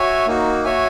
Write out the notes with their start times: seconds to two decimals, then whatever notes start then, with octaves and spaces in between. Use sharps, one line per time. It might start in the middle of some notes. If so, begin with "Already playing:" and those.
Already playing: F#4 C#5 E5 G#5
0.26 A#3 D#4 F#4
0.65 F#4 C#5 E5 G#5